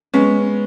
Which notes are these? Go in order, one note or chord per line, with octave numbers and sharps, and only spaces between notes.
G#3 B3 C#4